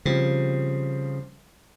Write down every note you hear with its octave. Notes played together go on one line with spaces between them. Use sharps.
C#3 F3 G3 C4